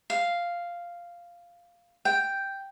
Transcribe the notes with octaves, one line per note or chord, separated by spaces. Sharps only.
F5
G5